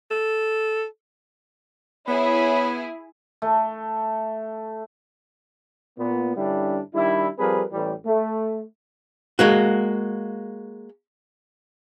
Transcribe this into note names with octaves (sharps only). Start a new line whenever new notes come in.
A4
B3 E4 G#4 C#5 B5
A3
A#2 B3
G2 D3 G3 C#4 D4 E4
D#3 G3 D4 E4
F3 G3 C4 G#4 A#4 B4
A1 G3
A3
G#3 A#3 F#4